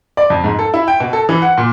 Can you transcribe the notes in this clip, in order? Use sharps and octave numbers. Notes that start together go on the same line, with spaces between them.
D5
F2
G#2
A4
E4
G5
B2
A4
E3
F#5
A#2